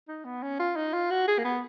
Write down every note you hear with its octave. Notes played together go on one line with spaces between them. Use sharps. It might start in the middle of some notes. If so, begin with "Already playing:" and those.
D#4
B3
C#4
F4
D#4
F4
F#4
G#4
A#3
B3